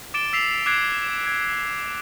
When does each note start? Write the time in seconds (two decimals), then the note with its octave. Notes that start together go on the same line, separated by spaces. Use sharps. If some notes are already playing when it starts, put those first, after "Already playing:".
0.14 D6 A6 D7 E7 G7
0.33 E6 B6 C7 F7
0.66 D6 F#6 G#6 C7 D7
1.27 G#6